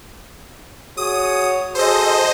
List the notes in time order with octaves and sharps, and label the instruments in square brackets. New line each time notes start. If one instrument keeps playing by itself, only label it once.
[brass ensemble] F#4 G#4 C#5 [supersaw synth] D#6
[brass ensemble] F#4 G#4 A4 [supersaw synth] C5 D#5